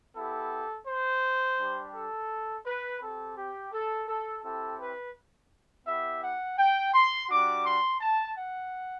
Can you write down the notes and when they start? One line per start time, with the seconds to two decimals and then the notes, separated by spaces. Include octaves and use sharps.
0.16 B3 E4 G4 A4
0.87 C5
1.59 G3 D4 G4
1.95 A4
2.66 B4
3.02 C4 G4 A4
3.37 G4
3.73 A4
4.09 A4
4.44 C4 E4 G4 A4
4.80 B4
5.87 B3 E4 G4 E5
6.23 F#5
6.59 G5
6.94 C6
7.29 G3 D4 F#4 D6
7.66 C6
8.01 A5
8.37 F#5